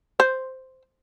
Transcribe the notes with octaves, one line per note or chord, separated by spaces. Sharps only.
C5